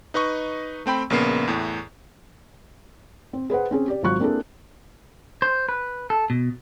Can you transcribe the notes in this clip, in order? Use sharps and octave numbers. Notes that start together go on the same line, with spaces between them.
D#4 B4 D#5 C#6
A3 C4 G5 B5
A#1 C#3 A#3 B3 C7
E2 A2
C4
G#4 B4 C5 F#5
C4 C#4 G#4
G4 D5
G#1 F#3 F4 C#6 F#6
A#3 C4 D4 E4 G#4 A4
C5
B4
A4
B2